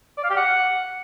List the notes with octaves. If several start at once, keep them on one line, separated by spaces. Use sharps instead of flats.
D5
F5
G4
F#5